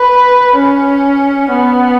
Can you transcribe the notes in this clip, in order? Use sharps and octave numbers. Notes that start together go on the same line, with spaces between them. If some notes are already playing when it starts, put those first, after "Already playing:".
Already playing: B4
C#4
B3